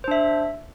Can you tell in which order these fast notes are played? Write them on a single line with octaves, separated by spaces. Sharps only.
C5 D4 E5